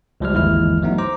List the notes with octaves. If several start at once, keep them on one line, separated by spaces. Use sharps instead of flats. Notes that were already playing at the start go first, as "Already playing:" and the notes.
C#2 F3 G3 F6
G1 D#2 E3 G#3 E4 F6
F#3 A3 B3 D#4
C5 A#5 D6